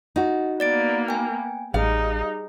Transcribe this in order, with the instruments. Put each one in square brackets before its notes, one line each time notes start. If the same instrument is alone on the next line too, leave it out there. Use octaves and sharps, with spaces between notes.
[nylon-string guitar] D#4 F#4 [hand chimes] D#5
[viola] A#3 B3 [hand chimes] D5 A6 D7
[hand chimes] G5 G#5
[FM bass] A1 [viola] G3 D#4 [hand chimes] G#4 [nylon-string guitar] F5